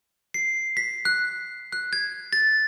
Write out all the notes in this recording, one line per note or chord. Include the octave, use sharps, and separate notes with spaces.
C7
B6
F#6
F#6
G#6
A6